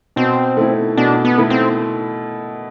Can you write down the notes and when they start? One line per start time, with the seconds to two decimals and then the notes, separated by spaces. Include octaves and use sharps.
0.16 B2 C4
0.57 A3 E4
0.97 B2 D4
1.25 B3
1.38 A3 E4
1.50 C4